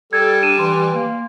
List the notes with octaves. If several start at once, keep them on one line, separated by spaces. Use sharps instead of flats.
G3 A4 G#6
D4 D#7 E7
E3 C6
A#3